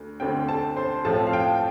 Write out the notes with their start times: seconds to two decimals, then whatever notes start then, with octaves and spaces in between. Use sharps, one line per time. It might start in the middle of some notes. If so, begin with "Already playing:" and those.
Already playing: D2 D3 A3
0.20 D2 D3 A3 C4 G5
0.48 A4 A5
0.77 C5 C6
1.04 A2 F3 C4 A4 A5
1.27 F5
1.33 G5